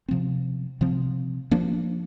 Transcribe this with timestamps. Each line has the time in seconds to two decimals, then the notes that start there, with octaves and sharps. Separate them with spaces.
0.08 C3 F3 C4
0.81 C3 F3 C4
1.51 F3 A#3 D4